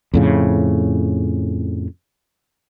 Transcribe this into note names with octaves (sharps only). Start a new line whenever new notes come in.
F2 A2 C#3